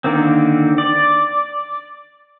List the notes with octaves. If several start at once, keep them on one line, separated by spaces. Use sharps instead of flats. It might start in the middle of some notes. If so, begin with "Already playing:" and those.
D3 D#3 A#3 C4
D5